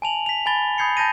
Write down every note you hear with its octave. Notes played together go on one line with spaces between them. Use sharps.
G#5 A5 F7 F#7
B6 F7
G#5 B5 A6 G7
B5 D#6 G6 G#6 C7 C#7
A5 G6 A6 A#6 D#7